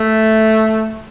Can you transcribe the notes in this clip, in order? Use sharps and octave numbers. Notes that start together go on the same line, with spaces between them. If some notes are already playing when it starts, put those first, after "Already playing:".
Already playing: A3